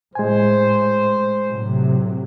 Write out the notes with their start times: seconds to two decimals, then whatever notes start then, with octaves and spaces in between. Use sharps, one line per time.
0.15 A2 G#3 C5 G#5
1.46 A2 C3 F#3